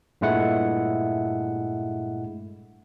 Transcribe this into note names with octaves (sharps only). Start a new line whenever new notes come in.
G2 A#2 G#3 A3 E4 F#5